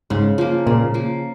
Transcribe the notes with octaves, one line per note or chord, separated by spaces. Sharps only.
G#2 C#3
F3 A#3
A#2 C#3
F3 A#3